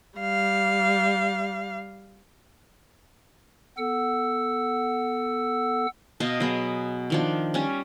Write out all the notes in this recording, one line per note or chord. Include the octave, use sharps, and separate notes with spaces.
G3 F5
B3 A4 F#5 E6
B2 D#5 F5 A5
F#3 B3 G#4
D#3 F3 D4
G3 C#4